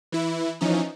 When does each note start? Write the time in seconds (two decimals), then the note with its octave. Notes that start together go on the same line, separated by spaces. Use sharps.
0.12 E3 E4
0.61 E3 F3 C#4 D#4